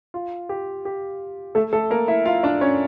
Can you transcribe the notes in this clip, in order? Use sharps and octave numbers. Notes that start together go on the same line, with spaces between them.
F4
G4
G4
A3 A4
A3 A4
A#3 A#4
E4 E5
F4 F5
D4 D5
C#4 C#5